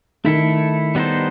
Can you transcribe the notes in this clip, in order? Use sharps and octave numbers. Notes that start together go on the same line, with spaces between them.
D#3 A3 E4 A4
G3 B3 D#4 A4 C5